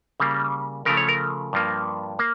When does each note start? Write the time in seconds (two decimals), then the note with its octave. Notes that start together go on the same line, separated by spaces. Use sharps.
0.20 C#3 G3 A#3
0.85 C#3 F3 A3 A#4
0.97 C#5
1.09 A#4
1.53 G2 F3 A#3
2.19 A#3